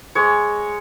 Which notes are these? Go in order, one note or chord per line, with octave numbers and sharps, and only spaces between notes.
G#3 C#5